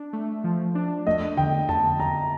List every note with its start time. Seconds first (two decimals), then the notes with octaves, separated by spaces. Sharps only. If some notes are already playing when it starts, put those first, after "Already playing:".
Already playing: D4
0.13 A3
0.44 F3
0.75 D4
1.07 A3 D#5
1.37 D3 G5
1.69 F2 A5
2.00 D3 A#5